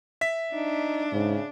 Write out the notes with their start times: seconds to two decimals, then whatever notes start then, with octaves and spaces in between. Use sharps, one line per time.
0.21 E5 B6
0.54 D4 D#4
1.12 G#2 C#3